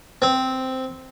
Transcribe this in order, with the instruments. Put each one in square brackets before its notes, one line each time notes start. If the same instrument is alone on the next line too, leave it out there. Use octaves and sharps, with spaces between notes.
[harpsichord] C4